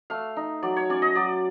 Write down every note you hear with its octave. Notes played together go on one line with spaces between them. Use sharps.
A3 F5
D#4
F#3 D5
C#5
C#4 D5
D#5
F#3 D5